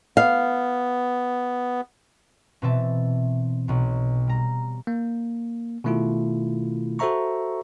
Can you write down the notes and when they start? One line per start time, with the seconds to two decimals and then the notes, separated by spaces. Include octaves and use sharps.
0.17 B3 F5
2.62 B2 E3 C4 B4 E5 A5
3.68 B1 B2
4.27 G3 A#5
4.87 A#3
5.84 B2 D#3 A3 E4 F4
6.99 F#4 A4 C5 E5 A#5 C#6